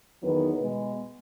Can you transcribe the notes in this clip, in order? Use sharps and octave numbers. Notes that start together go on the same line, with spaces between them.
E2 D#3 F#3 B3
B2 G#3 B3